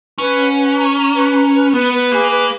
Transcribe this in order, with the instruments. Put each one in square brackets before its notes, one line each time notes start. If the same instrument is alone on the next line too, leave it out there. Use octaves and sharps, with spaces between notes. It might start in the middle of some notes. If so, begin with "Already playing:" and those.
[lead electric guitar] C#4 [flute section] B4
[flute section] F#5
B4
A#5
A#5
B4
A#5
B4
[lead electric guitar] B3 [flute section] B4
[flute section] B4
[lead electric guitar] A#3 [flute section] G#4
[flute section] B4